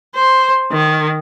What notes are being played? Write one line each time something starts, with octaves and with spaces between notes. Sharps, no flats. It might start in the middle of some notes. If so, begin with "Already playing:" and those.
C5
D#3